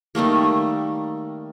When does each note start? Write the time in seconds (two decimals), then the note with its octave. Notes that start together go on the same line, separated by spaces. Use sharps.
0.15 D#3 G3 A3 A#3